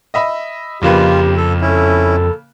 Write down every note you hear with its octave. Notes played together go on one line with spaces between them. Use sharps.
D#5 E5 B5
F2 C#3 A#3 F4 G4 B4
A4
C#4 E4 A4